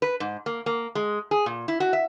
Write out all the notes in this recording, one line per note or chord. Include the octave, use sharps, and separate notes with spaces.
B4
G#2
A#3
A#3
G#3
G#4
A#2
E4
F#4
E5